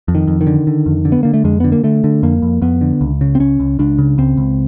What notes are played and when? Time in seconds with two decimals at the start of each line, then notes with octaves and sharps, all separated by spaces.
0.08 F2
0.15 D#3
0.27 F2
0.41 D#3
0.47 D3
0.67 D3
0.86 F2
1.05 D3
1.12 B3
1.23 D3 A#3
1.34 A3
1.44 F2 G#3
1.60 D3 B3
1.72 A#3
1.83 D3 A3
2.04 D3
2.23 F2 A#3
2.42 F2
2.62 F2 B3
2.81 D3
3.01 C#2
3.21 C#3
3.35 C4
3.40 C#2 C#4
3.60 C#2
3.79 C#2 D4
3.98 C#3
4.18 C#2 C4
4.37 C#2